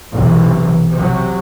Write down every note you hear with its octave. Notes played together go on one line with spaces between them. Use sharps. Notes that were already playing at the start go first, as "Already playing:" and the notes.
B1 C3 E3
C3 F#3